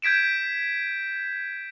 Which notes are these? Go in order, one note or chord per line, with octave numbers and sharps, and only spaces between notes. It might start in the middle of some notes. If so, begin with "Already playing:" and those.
G6 G#6 B6 D7 E7